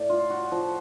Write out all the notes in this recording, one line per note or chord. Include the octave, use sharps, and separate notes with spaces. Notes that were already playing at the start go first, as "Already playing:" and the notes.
Already playing: A2 D5
F4
F#4
F3